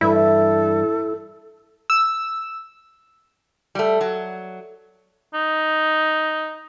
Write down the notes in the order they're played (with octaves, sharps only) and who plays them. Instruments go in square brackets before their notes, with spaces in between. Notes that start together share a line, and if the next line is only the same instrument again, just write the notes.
[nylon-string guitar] G2 E3 E5 [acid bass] E4 [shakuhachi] A4
[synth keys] E6
[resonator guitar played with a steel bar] G3 A3
F#3
[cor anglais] D#4